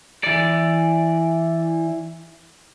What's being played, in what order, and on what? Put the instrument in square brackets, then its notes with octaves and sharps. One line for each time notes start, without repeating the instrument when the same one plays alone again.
[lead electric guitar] E3 D5